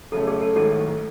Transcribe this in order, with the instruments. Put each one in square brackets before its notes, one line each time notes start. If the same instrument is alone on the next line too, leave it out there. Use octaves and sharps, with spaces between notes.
[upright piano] F#2 C#3 F#3 A3 C#4 [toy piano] A4
[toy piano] G#4
A4
[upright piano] A1 G#2 D#3 F#3 [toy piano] A4